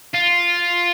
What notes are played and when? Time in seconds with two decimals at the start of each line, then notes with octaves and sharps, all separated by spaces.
0.14 F4